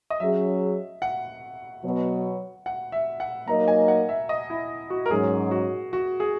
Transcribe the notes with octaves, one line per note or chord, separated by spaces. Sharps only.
D#5
F#3 C#4 G#4 E5
F#5
B2 F#3 B3
F#5
E5
F#5
F#3 A#3 D#4 A#4 D#5 A#5
G#5
F#5
E5
D#5
E4
F#4
A#4
G#2 F#3 C#4 G#4
F#4
F#4
G#4